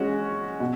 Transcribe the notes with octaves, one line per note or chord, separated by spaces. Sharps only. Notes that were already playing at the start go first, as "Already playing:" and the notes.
Already playing: G#3 C#4 F#4
B2